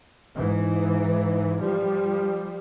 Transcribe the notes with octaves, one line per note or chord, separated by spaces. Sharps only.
G#2 E3
F3 G3